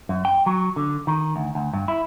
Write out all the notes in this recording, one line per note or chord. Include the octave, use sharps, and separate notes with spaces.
F#2
G5
F#3
D3
D#3
D2
D2
G2
E4